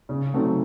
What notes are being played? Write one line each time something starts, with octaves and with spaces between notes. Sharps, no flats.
C#3
F#3 A3 C4 D#4